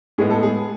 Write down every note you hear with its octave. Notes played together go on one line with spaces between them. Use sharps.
A2 G#3 B3 G#4
A4
G#4